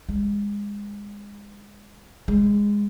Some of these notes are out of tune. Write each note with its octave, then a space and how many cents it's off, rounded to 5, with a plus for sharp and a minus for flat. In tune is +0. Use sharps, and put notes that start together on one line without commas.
G#3 -25
G#3 -15